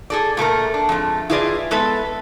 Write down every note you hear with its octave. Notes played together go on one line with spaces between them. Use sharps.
G#4 A4 D5
A#2 A3 A4 A#4
D4
F2 G#2 A3
E4 F4 G#4 B4 D5 D#5
G#3 B3 A4 B4 E5